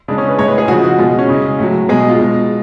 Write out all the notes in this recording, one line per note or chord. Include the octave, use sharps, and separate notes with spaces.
C#3 G#3 D4
C#4
B4
A2 G#3 C#5
B4
G#4
C#3 F3 G#3 F#4
F#4
B2 G#3 F4
C#4
C#3 G#3
A2 F#3
B2 G#3 G#4
F4
B2 G#3